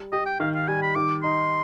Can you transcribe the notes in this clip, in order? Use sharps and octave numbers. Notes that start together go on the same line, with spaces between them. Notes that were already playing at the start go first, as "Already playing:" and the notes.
Already playing: G3
G4 D#5
G5
D#3 F5
F5
G3 G#5
B5
D#3 D6
D#4 C6